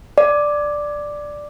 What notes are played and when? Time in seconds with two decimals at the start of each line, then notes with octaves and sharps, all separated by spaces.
0.18 D5